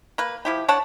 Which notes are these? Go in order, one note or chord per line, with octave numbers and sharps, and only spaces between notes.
A#3 B4
F3 E4 G4
D4 C#5 F#5 A5